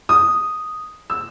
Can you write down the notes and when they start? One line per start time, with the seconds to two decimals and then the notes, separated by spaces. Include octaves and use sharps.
0.09 D#6
1.10 E6